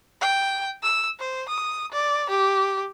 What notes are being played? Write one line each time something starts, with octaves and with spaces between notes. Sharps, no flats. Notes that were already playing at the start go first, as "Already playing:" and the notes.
G5
E6
C5
D#6
D5
G4